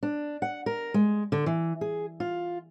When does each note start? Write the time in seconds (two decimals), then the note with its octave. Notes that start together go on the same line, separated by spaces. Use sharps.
0.03 D4
0.42 F#5
0.66 A#4
0.94 G#3
1.32 D3
1.46 E3
1.81 G#4
2.20 F4